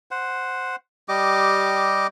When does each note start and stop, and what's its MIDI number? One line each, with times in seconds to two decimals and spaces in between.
0.11 0.76 72
0.11 0.76 78
1.09 2.07 55
1.09 2.07 67
1.09 2.07 75
1.09 2.07 86